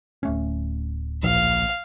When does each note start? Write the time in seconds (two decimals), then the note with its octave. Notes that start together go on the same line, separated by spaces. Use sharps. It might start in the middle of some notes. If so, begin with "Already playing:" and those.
0.23 D1 A3 C#4
1.23 A#1 F5